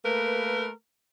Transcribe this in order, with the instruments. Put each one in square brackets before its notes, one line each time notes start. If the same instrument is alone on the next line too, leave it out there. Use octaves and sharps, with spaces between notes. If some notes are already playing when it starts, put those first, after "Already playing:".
[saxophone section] A3 A#3 A#4 B4